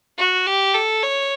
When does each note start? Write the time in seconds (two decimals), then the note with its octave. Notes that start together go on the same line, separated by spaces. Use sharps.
0.18 F#4
0.47 G4
0.75 A4
1.03 C#5